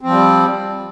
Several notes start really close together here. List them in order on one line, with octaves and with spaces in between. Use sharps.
C4 F3 G3